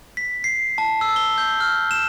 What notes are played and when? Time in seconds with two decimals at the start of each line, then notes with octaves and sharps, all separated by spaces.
0.17 B6
0.44 C7
0.78 A5
1.01 E6
1.16 G7
1.38 G6
1.60 F6
1.91 E7